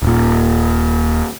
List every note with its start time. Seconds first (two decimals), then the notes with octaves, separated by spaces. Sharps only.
0.03 D#1 A#2